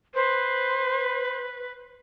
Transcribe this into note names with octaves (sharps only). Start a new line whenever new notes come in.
B4 C5